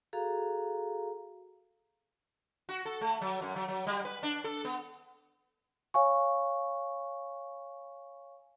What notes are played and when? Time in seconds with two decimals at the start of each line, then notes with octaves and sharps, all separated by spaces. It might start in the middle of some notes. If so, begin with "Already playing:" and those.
0.13 F#4 G#4 A4 F5 A#5
2.69 F#4
2.85 A4
3.01 A3
3.21 F#3
3.42 F#2
3.56 F#3
3.68 F#3
3.87 G3
4.05 B4
4.23 D4
4.44 A4
4.65 B3
5.94 C#5 F5 G#5 C#6